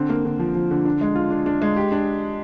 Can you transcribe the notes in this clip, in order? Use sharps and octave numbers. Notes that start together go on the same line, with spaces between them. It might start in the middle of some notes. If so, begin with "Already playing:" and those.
Already playing: D3 C4
A#3
D3
F3
F3
D3
D4
G#3
F4
D4
D4
G#3
G4
D4